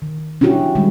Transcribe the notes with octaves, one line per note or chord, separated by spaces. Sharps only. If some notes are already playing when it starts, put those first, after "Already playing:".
D#3
C#4 D4 E4 F#4 G4
D#3 G3 G#3